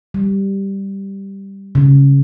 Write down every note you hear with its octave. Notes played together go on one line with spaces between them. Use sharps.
G3
C#3